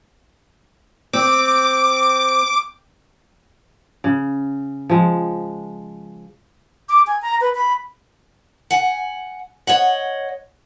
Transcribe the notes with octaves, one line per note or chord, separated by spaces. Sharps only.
C4 D6
C#3
F3 G#3
D6
G#5
A#5
B4
B5
F#5 G#5
C#5 D#5 F#5